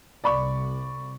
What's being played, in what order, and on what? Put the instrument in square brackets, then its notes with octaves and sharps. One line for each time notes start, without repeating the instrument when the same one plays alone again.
[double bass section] C2 [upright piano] D5 B5 C#6